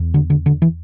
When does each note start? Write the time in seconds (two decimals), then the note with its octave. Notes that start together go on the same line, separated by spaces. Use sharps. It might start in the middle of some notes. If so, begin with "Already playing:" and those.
Already playing: E2
0.14 D3
0.30 D3
0.46 D3
0.62 E3